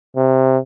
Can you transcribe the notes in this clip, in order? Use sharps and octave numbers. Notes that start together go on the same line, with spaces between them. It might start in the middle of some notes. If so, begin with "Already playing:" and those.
C3